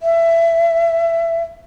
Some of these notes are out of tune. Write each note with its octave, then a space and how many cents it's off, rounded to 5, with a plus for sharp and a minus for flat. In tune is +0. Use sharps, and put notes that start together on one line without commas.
E5 +20